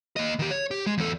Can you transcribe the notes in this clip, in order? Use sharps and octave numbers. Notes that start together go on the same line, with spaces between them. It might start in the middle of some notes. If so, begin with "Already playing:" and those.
A#3 D#5
D#3 G4
C#5
G4
G#3
E2 A4